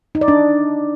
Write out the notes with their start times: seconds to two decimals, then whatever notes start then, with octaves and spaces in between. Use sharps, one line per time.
0.15 D#4
0.21 D5
0.28 D4